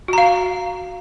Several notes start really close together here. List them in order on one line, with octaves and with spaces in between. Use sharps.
F#4 A#5 F5